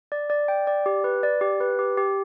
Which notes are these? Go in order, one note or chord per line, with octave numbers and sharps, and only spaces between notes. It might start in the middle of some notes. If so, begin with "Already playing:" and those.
D5
D5
G5
D5
G4
B4
D5
G4
B4
G4
G4